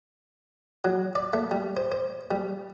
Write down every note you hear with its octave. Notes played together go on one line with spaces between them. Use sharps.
F#3
D5
A3
G3
C5
C5
G3